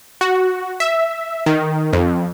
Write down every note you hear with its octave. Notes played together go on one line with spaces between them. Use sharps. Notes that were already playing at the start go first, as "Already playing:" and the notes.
F#4
E5
D#3
F2